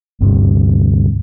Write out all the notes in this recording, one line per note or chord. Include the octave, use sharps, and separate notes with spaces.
G1 D2 G2 C3